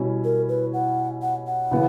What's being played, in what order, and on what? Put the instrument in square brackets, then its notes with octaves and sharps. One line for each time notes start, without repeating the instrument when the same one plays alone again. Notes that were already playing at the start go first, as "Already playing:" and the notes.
Already playing: [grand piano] B2 G3 C#4 E4
[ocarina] A#4
B4
F#5
F#5
F#5
[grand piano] C#3 E3 B3